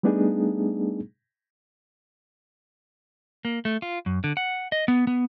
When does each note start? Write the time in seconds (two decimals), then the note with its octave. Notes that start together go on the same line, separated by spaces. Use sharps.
0.03 G3 A3 B3 D4 D#4 G#4
3.45 A#3
3.65 A3
3.82 F4
4.06 F#2
4.24 D3
4.37 F#5
4.72 D#5
4.88 B3
5.07 B3